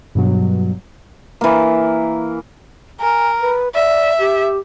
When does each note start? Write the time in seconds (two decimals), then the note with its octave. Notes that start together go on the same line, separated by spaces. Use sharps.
0.15 G2 B2 F#3
1.41 E3 A#3
3.00 A#4 G#5
3.41 B4
3.74 D5 E5
4.19 G4